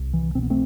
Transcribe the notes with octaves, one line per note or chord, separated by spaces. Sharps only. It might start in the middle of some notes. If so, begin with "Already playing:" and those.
Already playing: C2
E3
B2 C4
B3
A3 C4